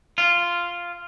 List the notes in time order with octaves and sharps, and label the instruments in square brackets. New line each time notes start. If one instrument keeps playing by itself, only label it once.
[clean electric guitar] F4